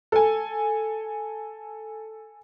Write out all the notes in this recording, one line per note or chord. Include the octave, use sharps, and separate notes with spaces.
A4 G#5